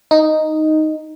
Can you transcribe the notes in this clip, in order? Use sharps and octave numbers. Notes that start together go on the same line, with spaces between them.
D#4